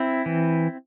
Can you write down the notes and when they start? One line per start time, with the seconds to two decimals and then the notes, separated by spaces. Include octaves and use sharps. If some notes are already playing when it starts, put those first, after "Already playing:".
Already playing: C4 E4
0.26 E3